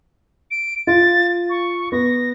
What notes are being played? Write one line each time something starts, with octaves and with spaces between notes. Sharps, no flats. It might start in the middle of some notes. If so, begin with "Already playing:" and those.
D7
F4 A6
C#6
B3 A#6